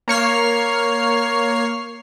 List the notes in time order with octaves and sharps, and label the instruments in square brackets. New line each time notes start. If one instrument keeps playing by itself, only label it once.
[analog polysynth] A#3 C#5 F6 C7